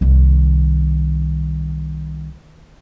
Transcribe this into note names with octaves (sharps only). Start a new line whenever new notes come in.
C2 D#3